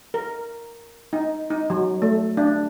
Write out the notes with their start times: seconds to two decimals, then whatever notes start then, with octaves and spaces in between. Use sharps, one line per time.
0.14 A#4
1.13 D#4
1.50 D#4
1.70 F#3
2.02 A3
2.37 D4